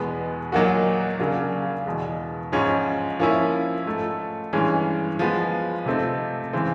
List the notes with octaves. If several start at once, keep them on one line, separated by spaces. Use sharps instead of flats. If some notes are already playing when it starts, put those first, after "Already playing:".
Already playing: E2 B2 G#3 B3
A#2 F#3 A#3 D#4 F#4
C#3 F#3 A#3 D4 F4
E2 B2 G#3
G#2 F3 G#3 C#4
F3 A#3 C#4 E4
G#2 F3 A3
G2 E3 G#3 C#4
F3 G#3 B3
C3 F3 A3 C4 D#4
C#3 E3 G#3 C4